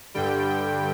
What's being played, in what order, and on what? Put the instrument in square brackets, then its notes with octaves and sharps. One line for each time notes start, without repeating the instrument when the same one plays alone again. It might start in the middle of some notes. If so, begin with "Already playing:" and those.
[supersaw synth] G2 D3 G3 G5